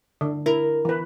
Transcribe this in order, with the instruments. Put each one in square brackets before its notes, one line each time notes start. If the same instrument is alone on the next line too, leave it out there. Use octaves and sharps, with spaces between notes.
[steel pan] D3
[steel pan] E4 [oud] A#4
[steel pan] E3 B4